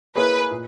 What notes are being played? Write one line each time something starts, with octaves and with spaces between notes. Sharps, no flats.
A#3 E4 G#4 B4 C#5
A#2